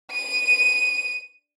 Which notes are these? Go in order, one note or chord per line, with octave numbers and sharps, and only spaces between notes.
D#7